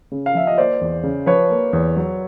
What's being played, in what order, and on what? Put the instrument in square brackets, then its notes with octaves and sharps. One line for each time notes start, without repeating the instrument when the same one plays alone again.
[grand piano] C#3
[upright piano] F5
[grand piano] F3 [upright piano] E5
[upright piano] D#5
[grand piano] A#3 [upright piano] C5 D5
[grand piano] E2
C#3
[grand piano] F3 [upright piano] B4 C#5
[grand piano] A#3
E2
F#3